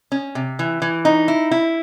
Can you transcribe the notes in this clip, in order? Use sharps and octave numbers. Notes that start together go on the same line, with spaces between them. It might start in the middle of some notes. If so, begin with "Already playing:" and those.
C#4
C3
E3
E3
D#4
E4
E4